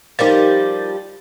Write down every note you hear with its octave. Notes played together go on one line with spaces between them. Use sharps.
F3 G3 D#4 G4 A#4 A6